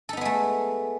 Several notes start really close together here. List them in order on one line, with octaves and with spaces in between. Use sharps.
A4 D#4 B3 G#3 A3